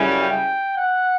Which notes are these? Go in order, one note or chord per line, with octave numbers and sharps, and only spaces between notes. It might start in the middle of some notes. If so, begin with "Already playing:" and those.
Already playing: F#2 C#3 G3 C#4 E4
G5
F#5